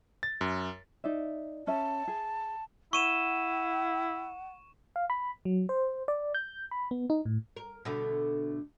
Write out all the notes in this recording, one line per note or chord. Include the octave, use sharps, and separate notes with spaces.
A6
F#2
D#4 D5 E5
C#4 E5 A5
G#4
E4 F#5 C#6 D#7 E7
F5
B5
F#3
C5
D5
G6
B5
B3
D#4
A2
A#4
B2 D3 A3